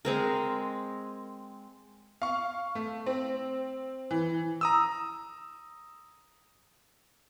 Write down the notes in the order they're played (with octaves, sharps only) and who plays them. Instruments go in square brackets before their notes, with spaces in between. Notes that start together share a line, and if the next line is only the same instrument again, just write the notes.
[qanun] G#3 C4 A#4
[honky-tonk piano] F5 C#6
A3
C4
E3
[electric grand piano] A#5 D#6 E6